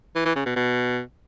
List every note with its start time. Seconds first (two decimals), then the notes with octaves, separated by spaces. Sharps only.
0.16 E3
0.26 E3
0.36 C#3
0.46 B2
0.56 B2